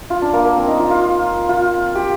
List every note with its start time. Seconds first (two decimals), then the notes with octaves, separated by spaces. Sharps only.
0.10 F4
0.22 D4
0.33 A#3
0.45 A#3
0.56 C4
0.67 D#4
0.80 F4
0.91 F4
1.49 F4
1.95 G4